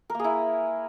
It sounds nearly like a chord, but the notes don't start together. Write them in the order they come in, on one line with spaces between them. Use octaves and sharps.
A#4 A#3 G#4 E4